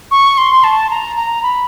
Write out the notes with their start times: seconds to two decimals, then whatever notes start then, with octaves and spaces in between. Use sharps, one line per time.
0.11 C#6
0.38 C6
0.64 A5
0.90 A#5
1.16 A#5
1.43 B5